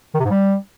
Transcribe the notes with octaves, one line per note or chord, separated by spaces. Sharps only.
D#3
C3
G#2
G3